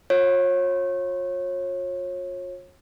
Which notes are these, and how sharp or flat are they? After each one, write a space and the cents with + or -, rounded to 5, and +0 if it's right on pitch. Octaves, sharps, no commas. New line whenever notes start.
F4 +40 C#5 -30